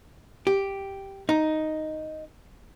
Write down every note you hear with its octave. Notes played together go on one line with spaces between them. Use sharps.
G4
D#4